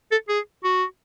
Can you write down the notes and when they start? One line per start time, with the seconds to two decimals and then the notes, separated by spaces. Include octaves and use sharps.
0.11 A4
0.29 G#4
0.64 F#4